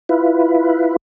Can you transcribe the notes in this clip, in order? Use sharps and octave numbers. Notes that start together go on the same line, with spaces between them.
E4 F4 B4